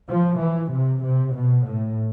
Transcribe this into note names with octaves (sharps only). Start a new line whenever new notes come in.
F3
E3
C3
C3
B2
A2